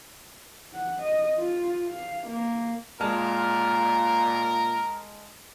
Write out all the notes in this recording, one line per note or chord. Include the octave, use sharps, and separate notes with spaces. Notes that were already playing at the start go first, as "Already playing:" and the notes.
F#5
D#5
F4
F5
A#3
A#2 G#3 A#4 A5 F6